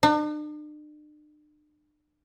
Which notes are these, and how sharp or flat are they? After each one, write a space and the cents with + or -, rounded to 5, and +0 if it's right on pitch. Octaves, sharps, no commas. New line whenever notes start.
D4 +45